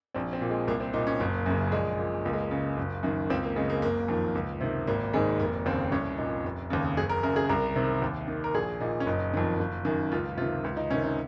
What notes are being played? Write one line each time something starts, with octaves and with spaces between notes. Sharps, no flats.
A#1 C4
C4
A#2
G#3
C2 A#3
C4
A#2 D#4
C#4
F#1 A#3
F#2 C#3
A#1 G#3
A#2
C#2 A#3
G#3
A#3
C#3
F#1
F#2 D#3
C#2 C4
A#3
C#3 G#3
A#3
F#1 A#3
F2 D#3
C#2
C3 D#3
G#1 A#3
G#2 D#3 G#3
F1 A#3
D#2 C#3 C4
C2 C#4
A#2 D#4
F1
D#2 C#3
F#1 G#4
A#4
F#2 C#3 A#4
G#4
C2 A#4
C3 D#3
D#2
D#3
A#4
A#1 G#4
A#2 D#4
C#4
F#1 D#4
F2 D#3
F#1
F#2 D#3
C#2 F4
C3 D#3 F4
C#2
D#4
C3 D#3 C#4
D#4